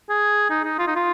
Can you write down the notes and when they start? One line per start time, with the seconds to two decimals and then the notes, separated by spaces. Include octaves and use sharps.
0.09 G#4
0.50 D#4
0.64 D#4
0.79 F4
0.87 D#4
0.96 F4